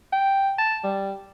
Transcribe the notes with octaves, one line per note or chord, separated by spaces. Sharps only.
G5
A5
G3